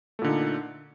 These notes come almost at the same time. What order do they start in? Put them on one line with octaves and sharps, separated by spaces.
A3 A#2 D3 D#4